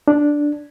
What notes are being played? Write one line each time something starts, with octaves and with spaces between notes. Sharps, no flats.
D4